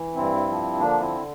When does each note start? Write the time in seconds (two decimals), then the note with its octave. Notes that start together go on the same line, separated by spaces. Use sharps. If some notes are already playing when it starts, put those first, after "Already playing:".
Already playing: E3
0.15 G2 C4 E4
0.48 F3
0.79 D3 A#3 D4
1.01 C4 E4